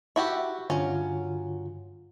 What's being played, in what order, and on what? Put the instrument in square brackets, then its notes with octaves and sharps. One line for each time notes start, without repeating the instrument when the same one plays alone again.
[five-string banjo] E4 F#4 G4 [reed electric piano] E5 C#6
[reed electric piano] G2 D3 F4 [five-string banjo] F#3 C#4